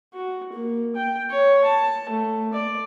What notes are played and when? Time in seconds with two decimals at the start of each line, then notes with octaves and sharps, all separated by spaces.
0.14 F#4
0.53 A#3
0.95 G5
1.31 C#5
1.65 A5
2.09 A3
2.53 D5